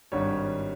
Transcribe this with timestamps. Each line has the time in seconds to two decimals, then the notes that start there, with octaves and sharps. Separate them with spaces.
0.12 G#1 G2 G3 C#5